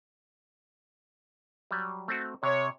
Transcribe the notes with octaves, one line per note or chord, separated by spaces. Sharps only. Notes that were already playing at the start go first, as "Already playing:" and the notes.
F#3 G3
A3 C4 F#4
C3 C#5